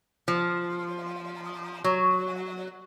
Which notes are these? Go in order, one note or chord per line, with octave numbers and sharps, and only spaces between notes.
F3
F#3